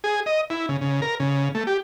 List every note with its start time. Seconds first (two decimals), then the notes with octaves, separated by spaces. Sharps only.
0.04 G#4
0.26 D#5
0.50 E4
0.69 C#3
0.81 C#3
1.02 A#4
1.20 C#3
1.55 A3
1.67 G4